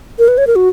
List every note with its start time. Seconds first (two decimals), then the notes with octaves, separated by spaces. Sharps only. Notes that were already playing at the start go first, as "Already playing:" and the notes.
0.19 A#4
0.28 B4
0.38 C#5
0.47 A#4
0.56 F#4